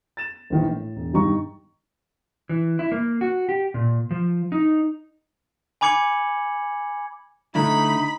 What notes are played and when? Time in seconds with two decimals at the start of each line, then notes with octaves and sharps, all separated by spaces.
0.17 A6 E7
0.50 A#1 D#3 E3
0.67 A2
0.96 E1
1.13 G2 D#3 G3 D#4 A#5 C#6
2.49 E3
2.79 E4
2.92 A#3
3.21 F#4
3.49 G4
3.74 A#2
4.11 F3
4.52 D#4
5.81 G#5 B5 D6 G#6 C#7 F#7
7.55 D3 A3 D#4 E4 B5